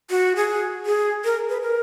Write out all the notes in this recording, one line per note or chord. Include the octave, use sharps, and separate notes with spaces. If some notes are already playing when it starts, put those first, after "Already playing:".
F#4
G#4
G#4
A#4
B4
A#4